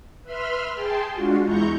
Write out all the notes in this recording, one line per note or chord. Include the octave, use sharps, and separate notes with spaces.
B4 E5 B5 C6 F6
G#4 G5 A5 C6
G#3 D4 F4 F#4
E2 G#3 E4 A#5 C#6 G6